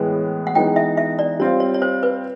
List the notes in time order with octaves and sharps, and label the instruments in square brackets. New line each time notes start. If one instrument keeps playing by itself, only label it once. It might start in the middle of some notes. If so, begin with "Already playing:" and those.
Already playing: [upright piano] A2 E3 G#3 B3
[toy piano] F#5
[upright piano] E3 G#3 B3 D#4 [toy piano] G5
[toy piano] E5
E5
D5
[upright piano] G3 C4 F4 [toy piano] C#5
[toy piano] C#5
C#5
C5
B4